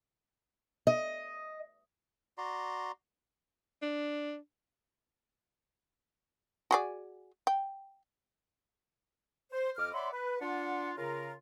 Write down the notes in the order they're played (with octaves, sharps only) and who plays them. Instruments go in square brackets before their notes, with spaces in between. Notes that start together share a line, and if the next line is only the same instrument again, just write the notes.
[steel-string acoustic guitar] D#5
[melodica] F#4 D5 A#5 C6
[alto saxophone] D4
[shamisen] F#4 G#4 D5
G5
[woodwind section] C5
F2 D#5 D6 F6
C#5 D5 E5 F#5 B5 C6
B4
D4 F4 F#5
C#3 F4 A#4